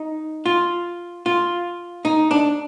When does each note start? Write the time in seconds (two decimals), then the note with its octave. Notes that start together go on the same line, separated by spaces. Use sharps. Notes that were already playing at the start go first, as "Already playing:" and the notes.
Already playing: D#4
0.46 F4
1.26 F4
2.05 D#4
2.31 D4